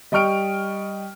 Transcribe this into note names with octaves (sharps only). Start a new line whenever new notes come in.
G3 D#5 G5 C#6 F6 D7